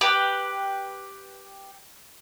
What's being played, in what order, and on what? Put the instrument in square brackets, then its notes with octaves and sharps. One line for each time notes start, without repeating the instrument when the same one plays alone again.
[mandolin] G4 B4